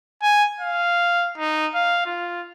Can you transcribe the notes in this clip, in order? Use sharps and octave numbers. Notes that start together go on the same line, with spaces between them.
G#5
F5
D#4
F5
F4